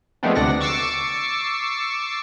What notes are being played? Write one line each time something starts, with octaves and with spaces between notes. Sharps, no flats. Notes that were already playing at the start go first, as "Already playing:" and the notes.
F3 G#3 A3 B3 C4 D4
D2 C3 D4 D5 F#5 A#6
C#6 D6 E6 A6 C7 C#7